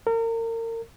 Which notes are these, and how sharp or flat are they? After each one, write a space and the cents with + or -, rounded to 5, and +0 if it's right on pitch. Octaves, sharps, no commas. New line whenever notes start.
A#4 -35